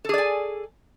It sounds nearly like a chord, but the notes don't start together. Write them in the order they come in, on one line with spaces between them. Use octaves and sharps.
A4 G#4 D5 G#5